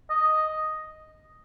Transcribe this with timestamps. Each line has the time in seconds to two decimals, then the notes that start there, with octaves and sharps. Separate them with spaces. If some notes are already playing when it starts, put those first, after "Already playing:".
0.10 D#5